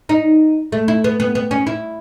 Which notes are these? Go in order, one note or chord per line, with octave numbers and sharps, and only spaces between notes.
D#4
A3
E4
B3
B3
B3
C#4
E4